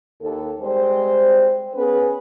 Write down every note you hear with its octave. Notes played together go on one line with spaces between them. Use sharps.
D#2 A4
G3 G#3 C4 C5
B3 C#4 G#4 B4